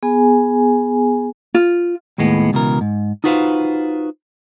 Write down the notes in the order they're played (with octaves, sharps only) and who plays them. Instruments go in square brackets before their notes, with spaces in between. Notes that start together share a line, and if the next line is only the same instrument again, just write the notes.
[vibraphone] B3 G#4 G#5
[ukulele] F4
[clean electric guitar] D#2 A2 G#3 B3
C#2 B2 E3 A#4
G#2
D#4 F4 F#4 B4 C5 F5